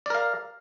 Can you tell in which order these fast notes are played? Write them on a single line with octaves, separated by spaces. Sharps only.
D5 A#4 F5